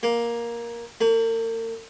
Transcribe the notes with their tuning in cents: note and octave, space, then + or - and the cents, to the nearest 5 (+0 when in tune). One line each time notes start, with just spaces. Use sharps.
A#3 +10
A#3 -45